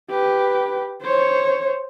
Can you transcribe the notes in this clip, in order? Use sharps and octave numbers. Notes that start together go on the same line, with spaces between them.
G4 B4
C5 C#5